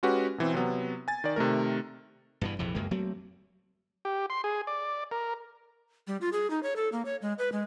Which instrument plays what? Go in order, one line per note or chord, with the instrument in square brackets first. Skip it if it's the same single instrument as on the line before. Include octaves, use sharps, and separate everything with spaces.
[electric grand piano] G#3 C#4 F#4 G4 B4
B2 E3 C4
C3 F#3 B3
G#5 A6
D#3 D5
C3 D#3 A3 A#4
[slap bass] G2 B2 E3
A#1 F2 C3 E3
C#2 F#2 G#3 A#3
F#3 A3 A#3 C4
[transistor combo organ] G4
C6
G#4
D5
A#4
[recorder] G3
F4
G#4
D#4
C#5
A4
A#3
C#5
G#3
B4
G#3